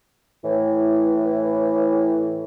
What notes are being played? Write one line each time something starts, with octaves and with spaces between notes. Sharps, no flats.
A2 E3